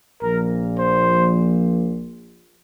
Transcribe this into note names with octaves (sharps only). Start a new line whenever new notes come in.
A#1 A#2 F3 A#4
C5